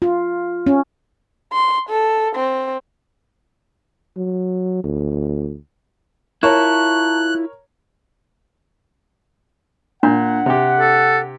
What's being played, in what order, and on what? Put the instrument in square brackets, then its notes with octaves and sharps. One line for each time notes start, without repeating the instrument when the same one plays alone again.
[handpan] F4
C#4
[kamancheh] C6
A4
C4
[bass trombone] F#3
D2
[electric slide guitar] E4 F4 [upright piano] A#4 C#5 [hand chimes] A5 A#5 C#6 [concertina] F#6
[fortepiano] A#2 [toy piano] D4 [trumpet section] F#5
[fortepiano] C3 G4
[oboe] A4